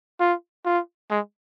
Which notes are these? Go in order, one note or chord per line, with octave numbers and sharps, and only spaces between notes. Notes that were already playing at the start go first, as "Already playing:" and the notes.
F4
F4
G#3